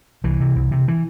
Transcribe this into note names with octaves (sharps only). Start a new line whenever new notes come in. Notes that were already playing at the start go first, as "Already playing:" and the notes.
C2 E3
C3
C2
C3
E3